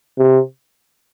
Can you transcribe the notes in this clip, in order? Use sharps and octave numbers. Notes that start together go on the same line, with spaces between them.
C3